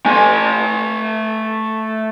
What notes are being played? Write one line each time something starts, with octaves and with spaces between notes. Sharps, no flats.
A3 G#5